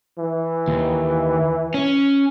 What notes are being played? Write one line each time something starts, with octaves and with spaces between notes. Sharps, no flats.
E3
D#2
C#4